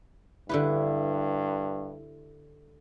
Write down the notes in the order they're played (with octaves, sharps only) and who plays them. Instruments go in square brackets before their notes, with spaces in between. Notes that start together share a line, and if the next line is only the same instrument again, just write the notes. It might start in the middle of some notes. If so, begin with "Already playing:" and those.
[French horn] G2 [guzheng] D3 G4 B4 [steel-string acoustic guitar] E4